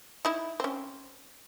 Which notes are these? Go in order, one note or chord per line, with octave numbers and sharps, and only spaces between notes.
D#4 E4
C4 C#4